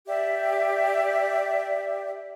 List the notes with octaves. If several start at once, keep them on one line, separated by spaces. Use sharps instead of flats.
G4 D5 E5